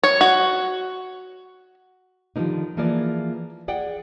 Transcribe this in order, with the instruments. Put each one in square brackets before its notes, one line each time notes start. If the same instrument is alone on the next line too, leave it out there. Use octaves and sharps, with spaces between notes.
[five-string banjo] C#5
F#4
[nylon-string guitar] D3 D#3 F3 G3 A#3 D#4
E3 F3 A#3 G#4 A#4 D5
G#4 D5 F#5 G5